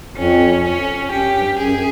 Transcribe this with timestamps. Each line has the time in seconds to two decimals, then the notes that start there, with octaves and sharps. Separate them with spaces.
0.16 F2 C#4
0.64 C#4
1.12 F#2 G4
1.36 G2
1.59 F#2 G#4